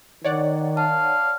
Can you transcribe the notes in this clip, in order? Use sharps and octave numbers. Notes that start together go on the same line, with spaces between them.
D#3 C#5 D5 F#5
F5 A5